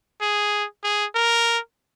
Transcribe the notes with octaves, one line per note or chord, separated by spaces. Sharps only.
G#4
G#4
A#4